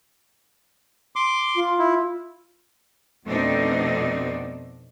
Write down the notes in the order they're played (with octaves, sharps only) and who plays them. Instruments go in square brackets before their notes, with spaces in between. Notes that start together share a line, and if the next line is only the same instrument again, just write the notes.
[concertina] C6 D6
[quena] F4
[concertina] E4
[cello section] F2 B2 A3 C4 D4 D#4